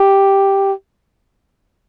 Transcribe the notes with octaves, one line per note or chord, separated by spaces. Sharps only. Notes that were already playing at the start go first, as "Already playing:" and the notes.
Already playing: G4